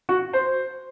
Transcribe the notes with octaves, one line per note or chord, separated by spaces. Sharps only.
F#4
C5